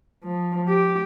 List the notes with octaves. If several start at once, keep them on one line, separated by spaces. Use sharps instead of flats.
F3
G4